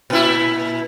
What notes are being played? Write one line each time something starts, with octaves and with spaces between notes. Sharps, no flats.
A#2 E4